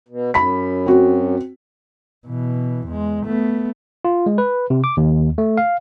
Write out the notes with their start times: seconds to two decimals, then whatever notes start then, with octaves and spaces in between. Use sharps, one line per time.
0.09 B2
0.34 F#2 B5 B6
0.86 C4 F#4
2.27 B2 E3
2.87 E2 G#3
3.25 A3 B3
4.05 F4
4.26 G#3
4.38 B4
4.70 C3
4.84 D6
4.97 D#2
5.38 A3
5.57 F5